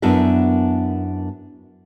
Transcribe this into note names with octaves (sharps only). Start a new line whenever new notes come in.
F#2 B3 D4 E4 A#4 E5